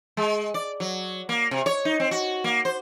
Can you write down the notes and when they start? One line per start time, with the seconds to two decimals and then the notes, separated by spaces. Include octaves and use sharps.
0.17 G#3
0.54 D5
0.80 F#3
1.29 A#3
1.51 C3
1.66 C#5
1.85 D#4
2.00 C4
2.11 F#4
2.44 A#3
2.65 C5